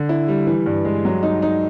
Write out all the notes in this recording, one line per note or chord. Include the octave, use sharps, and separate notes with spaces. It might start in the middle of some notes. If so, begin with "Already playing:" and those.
Already playing: D3
E4
G3
E3
G2
G#3
F#3
D#4
D#4